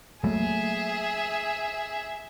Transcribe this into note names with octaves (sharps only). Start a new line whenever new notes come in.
F#3 A3 A#3 G#4 E5